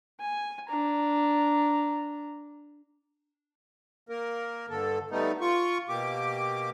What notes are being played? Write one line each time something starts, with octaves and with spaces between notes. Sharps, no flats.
G#5
D4 A#5
A#3 A#4
G2 D3 A4
G3 A3 B3 D#4
F4 C#6
B2 A#3 G4 D6